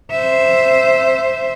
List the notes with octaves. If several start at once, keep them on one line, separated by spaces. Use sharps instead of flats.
C5 E5